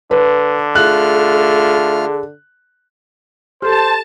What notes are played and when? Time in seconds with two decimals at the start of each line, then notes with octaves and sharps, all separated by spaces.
0.11 D3 B4
0.75 A3 F4 G#4 F6 F#6
3.62 G4 A4 C5 A5